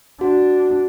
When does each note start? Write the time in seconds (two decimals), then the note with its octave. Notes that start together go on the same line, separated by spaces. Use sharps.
0.21 D4 F#4